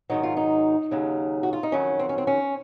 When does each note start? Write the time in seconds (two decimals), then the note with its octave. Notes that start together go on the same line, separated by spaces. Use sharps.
0.10 G#2 D#3 F#3 D#4
0.23 F4
0.37 D#4
0.91 D#2 C#3 F#3
1.43 F#4
1.53 F4
1.63 D#4
1.72 F2 D#3 F#3 C#4
1.99 C4
2.09 C#4
2.18 C4
2.27 C#4